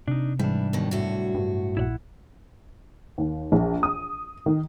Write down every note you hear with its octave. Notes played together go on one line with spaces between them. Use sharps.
C3 D4 D#4
G#2 E3 G3 D4
D#2 B2 D#3
F#2 A2 F#4
G2
A#1 E4 D5 F#5
D#2
A#1
D#6
D#3